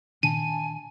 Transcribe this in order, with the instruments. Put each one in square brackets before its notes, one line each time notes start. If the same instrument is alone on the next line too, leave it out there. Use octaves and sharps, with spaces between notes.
[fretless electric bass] A#2 D#3 D4 [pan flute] G#5 [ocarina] A5 [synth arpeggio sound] D#7